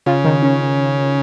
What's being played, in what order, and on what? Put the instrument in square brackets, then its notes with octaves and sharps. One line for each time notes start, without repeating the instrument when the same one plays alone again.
[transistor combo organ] C#3 [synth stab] F4
[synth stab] D#3
C#4